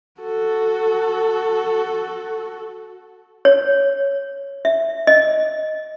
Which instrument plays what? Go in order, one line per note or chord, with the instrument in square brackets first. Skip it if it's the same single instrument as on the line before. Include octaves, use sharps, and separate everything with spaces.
[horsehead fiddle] F#4 A4
[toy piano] C#5
E5
D#5